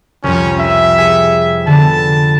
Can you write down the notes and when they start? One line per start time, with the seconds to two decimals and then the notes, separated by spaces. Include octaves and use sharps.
0.23 C2 F2 C#4
0.60 E5
0.98 G#4 C#5 G#5
1.67 D3 B3 A5